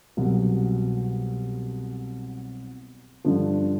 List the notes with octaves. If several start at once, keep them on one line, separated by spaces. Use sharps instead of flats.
C2 B2 F#3
G2 D3 F3